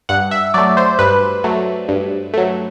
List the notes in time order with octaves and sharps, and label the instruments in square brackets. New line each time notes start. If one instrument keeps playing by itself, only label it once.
[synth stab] G2 F#5
E5
F#3 A3 D5
C5
G2 B4
F#3 A3
G2
F#3 A3